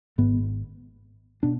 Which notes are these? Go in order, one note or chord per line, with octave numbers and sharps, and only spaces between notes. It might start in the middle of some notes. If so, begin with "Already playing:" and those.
G#1 G#2 B3
B2 D4